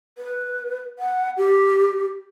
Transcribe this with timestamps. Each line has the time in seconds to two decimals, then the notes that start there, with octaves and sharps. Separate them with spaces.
0.18 B4
0.99 F#5
1.37 G4